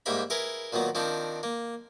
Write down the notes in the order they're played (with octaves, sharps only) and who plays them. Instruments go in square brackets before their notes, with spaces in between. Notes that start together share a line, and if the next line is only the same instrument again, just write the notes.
[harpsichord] G#2 G3 A#3 E5 B5
E4 G#4 A#4 B4
A#2 D#3 F#3 B3
D#3 F3 C4 D4
A#3